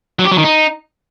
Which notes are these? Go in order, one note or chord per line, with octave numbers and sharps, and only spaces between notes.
F#3
G4
F#3
D#3
D#4